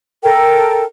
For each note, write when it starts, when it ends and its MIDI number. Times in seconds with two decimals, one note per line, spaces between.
0.23 0.84 69
0.23 0.84 70
0.23 0.84 79